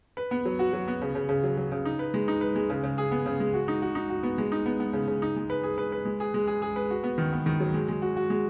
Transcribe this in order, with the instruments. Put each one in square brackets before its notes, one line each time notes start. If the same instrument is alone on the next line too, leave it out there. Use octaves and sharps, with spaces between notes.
[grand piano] B4
B3
F#3
F#4
F#3
B3
C#3
C#3
C#3
F#3
F#3
C#3
D#4
B4
G#3
D#4
B4
G#3
C#3
C#3
G#4
B3
C#3
G#3
F#4
D#4
F#4
D#4
F#4
B3
G#3
D#4
B3
B3
C#3
C#3
D#4
G#3
B4
G#4
B4
B4
G#3
G#4
G#3
G#4
G#4
B4
F#4
B3
D#3
B3
D#3
F#3
G#3
G#3
F#4
F#4
G#3